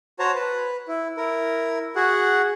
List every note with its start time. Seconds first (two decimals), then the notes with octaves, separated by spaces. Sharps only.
0.19 F#4 C5 C#5 A5 A#5
0.35 B4
0.88 E4
1.17 E4 A#4
1.96 F#4 G#4 F#5